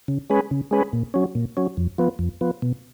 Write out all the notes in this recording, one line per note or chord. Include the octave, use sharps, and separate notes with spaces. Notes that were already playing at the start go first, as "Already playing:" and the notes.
C#3
G#3 C#4 G#4 B4
C#3
G#3 C#4 G#4 B4
A#2
F#3 C#4
A#2
F#3 C#4
F2
F3 B3
F2
F3 B3
B2